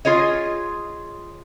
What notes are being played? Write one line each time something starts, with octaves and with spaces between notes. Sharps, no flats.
F4 G#4 C#5 D#5